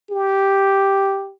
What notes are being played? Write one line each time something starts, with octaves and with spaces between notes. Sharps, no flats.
G4